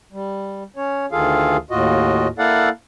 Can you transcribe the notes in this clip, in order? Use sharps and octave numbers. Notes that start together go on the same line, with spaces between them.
G3
C#4 C#5
D2 D#3 F4 G#4 A4 F5
D#2 A2 F4 F#4 D#5
A#3 E4 A4 D5 F5 F#5